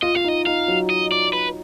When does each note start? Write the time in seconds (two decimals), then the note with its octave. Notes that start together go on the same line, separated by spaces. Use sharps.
0.02 F4 D#5
0.15 F4 F5
0.24 D#4
0.28 D#5
0.46 D#4 F5
0.68 F#3
0.90 D#5
1.12 D5
1.33 B4